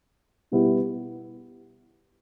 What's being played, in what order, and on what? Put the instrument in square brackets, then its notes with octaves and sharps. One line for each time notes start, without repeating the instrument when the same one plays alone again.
[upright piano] B2 G3 B3 E4 G4